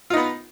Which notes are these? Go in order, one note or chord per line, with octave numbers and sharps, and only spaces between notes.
B3 D#4 F4